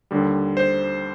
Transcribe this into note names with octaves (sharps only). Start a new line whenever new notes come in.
D#2 D3 G3
C5